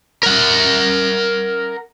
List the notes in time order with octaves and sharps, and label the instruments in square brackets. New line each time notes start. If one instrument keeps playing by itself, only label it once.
[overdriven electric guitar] A#4 F#5